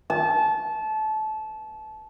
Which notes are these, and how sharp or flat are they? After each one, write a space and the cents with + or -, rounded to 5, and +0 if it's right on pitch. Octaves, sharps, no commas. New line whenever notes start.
A5 -25